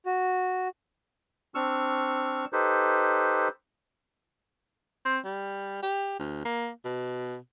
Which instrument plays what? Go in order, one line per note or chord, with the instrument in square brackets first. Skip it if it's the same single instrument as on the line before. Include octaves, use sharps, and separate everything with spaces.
[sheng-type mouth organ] F#4
[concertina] C4 D4 C#6 E6 F6
D#4 G4 A4 B4 C5
[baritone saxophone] C4
G3
G4
D2
A#3
B2